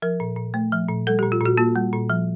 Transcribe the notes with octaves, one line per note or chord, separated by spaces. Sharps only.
F3 A#4
A#2
A#2
A3
F3
A#2
G3 A4
A#2 G4
F4
A#2 F#4
A#3 F4
G3
A#2
F3